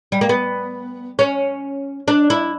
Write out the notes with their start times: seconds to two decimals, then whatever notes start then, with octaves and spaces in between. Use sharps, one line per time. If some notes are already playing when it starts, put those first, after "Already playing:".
0.12 G3
0.21 A#3
0.29 B3
1.19 C#4
2.08 D4
2.30 E4